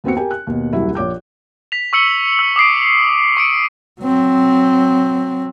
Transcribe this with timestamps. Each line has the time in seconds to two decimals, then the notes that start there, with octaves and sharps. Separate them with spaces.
0.04 D#2 B3 C4 F#4 C#7
0.17 G4 A#4 G5 G#5
0.31 F#6
0.47 D#2 B2
0.73 D#1 C2 F#3 E4
0.95 A#1 C#5 D6 G6
1.72 B6 F7
1.93 C#6 E6 C#7 F#7 G7
2.39 E6
2.56 D6 D#6 C7 D7
3.37 C#6 C#7 D7
4.01 F#3 C4